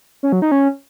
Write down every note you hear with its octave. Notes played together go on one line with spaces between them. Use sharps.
C#4
F#3
D#4
C#4